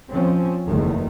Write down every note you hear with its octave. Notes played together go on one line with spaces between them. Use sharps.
F3 C4 C#4
F#1 E2 D#3 A3